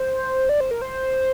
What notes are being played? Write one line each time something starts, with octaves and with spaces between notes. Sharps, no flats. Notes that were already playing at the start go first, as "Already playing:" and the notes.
Already playing: C5
D5
C5
A#4
C5